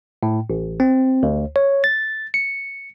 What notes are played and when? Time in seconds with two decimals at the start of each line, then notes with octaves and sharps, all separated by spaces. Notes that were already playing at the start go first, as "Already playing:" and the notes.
0.23 A2
0.50 A1
0.80 C4
1.23 D2
1.56 C#5
1.84 A6
2.34 C#7